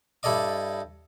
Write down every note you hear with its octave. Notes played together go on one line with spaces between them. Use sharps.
G2 E4 A4 D5 D#5 D6